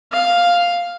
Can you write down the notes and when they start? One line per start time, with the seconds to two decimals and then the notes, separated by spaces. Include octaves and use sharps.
0.12 F5